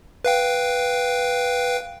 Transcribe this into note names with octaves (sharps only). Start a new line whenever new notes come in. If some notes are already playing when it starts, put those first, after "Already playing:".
B4 F5 G5